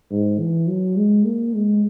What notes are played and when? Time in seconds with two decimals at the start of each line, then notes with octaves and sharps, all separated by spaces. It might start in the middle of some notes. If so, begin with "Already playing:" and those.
0.11 G#2
0.40 E3
0.68 F#3
0.97 G#3
1.25 A#3
1.54 G#3